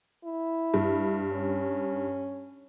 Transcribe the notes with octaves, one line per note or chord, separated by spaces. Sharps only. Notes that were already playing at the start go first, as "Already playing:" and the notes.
E4
G2
C#4